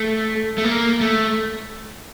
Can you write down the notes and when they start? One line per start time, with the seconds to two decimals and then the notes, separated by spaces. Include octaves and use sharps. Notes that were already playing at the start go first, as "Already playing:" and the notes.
Already playing: A3
0.58 A3
0.64 A#3
1.01 A3